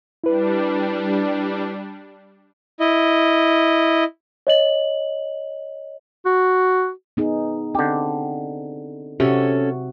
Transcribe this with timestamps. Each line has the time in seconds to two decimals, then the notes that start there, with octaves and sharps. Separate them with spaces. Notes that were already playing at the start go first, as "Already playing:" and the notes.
0.24 G3 D4 E4 B4
2.80 E4 D#5
4.47 C#5 D#5 F#7
6.26 F#4
7.17 B3 D#4 G#4
7.75 D3 C4 G4
9.20 C3 C#4 F#4 A4 C#5